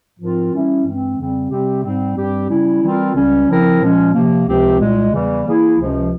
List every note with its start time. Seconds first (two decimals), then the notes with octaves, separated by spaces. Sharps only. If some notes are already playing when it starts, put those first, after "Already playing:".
0.19 G#2 F3 C4 F4 A#4
0.51 E3 G3 C#4 E4
0.84 G2 E3 G#3 C4
1.17 F2 C#3 G3 C4
1.50 C3 G3 C4 G4
1.83 G#2 G3 C4
2.16 G2 G3 C4 G4
2.49 C#3 G3 C#4 E4
2.83 E3 G3 C4 F4 A#4
3.15 C#2 C#3 G3 C#4
3.48 C#3 F3 C4 E4 A#4
3.81 A#2 F3 G#3 C#4
4.13 C3 F3 A#3
4.47 C#2 C3 F3 C4 G4
4.79 C2 A#2 G#3
5.12 E2 C#3 E3 G3
5.46 E3 A#3 E4 G#4
5.78 C#2 C3 F3 G#3 C#4